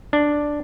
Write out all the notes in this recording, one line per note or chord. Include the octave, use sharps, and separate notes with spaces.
D4